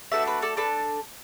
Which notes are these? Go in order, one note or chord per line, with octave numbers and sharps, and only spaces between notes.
A3 D4 F#4 B4 E5
B4
A4 D5
D4 A4 B4